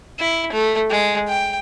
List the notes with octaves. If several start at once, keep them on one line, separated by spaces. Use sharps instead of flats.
E4
A3
G#3
G5